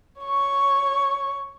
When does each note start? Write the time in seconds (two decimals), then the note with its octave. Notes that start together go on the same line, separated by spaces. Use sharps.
0.22 C#5 C#6